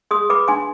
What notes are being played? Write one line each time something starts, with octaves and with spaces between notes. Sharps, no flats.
G#4 C6 D#6
B4 B5 D6
D4 G#5 C6